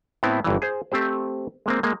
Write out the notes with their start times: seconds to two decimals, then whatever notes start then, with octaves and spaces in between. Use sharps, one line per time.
0.23 A2 B3 C4 E4
0.44 G1 G2 E3
0.62 G#4 C5
0.92 A3 C4 G4 C5
1.66 G#3 A#3 C4
1.83 G#3 A#3